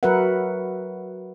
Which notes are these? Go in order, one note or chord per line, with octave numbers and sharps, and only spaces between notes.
F#3 F#4 A#4 B4 E5 F#5